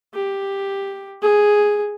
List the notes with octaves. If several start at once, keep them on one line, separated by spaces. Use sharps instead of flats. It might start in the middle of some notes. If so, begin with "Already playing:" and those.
G4
G#4